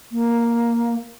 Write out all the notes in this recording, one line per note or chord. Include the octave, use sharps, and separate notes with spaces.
A#3